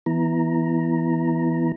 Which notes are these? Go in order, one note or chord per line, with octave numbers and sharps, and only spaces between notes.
E3 B3 E4 A#5